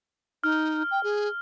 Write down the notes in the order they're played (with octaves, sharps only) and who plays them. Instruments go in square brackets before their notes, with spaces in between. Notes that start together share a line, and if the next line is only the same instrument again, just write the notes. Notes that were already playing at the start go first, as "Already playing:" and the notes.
[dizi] D#4 [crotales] F6
[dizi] G5
G#4